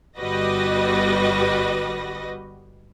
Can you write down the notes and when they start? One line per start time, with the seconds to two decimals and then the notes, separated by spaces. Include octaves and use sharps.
0.18 G1 G3 F#4 B4 D#5 A#6